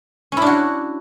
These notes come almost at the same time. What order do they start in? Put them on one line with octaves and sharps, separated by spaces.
C#4 E4 D4 F#4